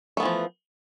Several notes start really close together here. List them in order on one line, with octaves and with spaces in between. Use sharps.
A3 B3 E3 F3